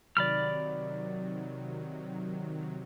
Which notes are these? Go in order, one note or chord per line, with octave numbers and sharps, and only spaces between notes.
C3 D#3 F#3 D5 B5 F6